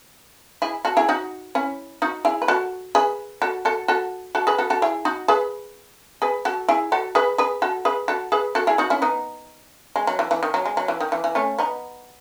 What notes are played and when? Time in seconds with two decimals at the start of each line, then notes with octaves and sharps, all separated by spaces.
0.62 E4 G#4
0.85 F#4 A4
0.97 E4 G#4
1.09 D#4 F#4
1.55 C#4 E4
2.02 D#4 F#4
2.25 E4 G#4
2.42 B4
2.48 F#4 A4
2.95 G#4 B4
3.42 F#4 A4
3.65 F#4 A4
3.88 F#4 A4
4.35 F#4 A4
4.47 G#4 B4
4.58 F#4 A4
4.70 F#4 A4
4.82 E4 G#4
5.05 D#4 F#4
5.28 G#4 B4
6.22 G#4 B4
6.45 F#4 A4
6.69 E4 G#4
6.92 F#4 A4
7.15 G#4 B4
7.38 G#4 B4
7.62 F#4 A4
7.85 G#4 B4
8.08 F#4 A4
8.32 G#4 B4
8.55 F#4 A4
8.67 E4 G#4
8.78 D#4 F#4
8.90 C#4 E4
9.02 B3 D#4
9.96 G#3
10.07 F#3
10.19 E3
10.31 E3
10.43 D#3
10.54 F#3
10.66 G#3
10.77 F#3
10.88 E3
11.00 D#3
11.12 E3
11.24 E3
11.35 A3 C#4
11.59 B3 D#4